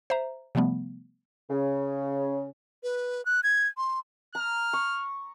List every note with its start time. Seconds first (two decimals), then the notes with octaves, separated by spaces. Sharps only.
0.10 C5 E5 A#5
0.55 C3 F3 G3 A3 B3
1.51 C#3
2.83 B4
3.26 F#6
3.43 G#6
3.77 C6
4.35 A#5 F6
4.73 C#6